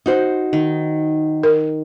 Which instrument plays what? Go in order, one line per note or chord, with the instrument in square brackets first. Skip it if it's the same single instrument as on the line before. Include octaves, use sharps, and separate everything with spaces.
[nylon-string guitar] D#4 F#4 C5
[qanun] D#3
[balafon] A#4